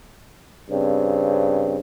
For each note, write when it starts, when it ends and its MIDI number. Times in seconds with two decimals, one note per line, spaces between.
0.71 1.80 43
0.71 1.80 49
0.71 1.80 60